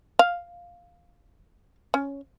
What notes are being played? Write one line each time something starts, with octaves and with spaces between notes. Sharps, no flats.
F5
C#4